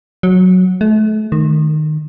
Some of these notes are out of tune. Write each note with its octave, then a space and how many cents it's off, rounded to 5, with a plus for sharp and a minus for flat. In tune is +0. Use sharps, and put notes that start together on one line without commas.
F#3 -10
A3 -35
D#3 -20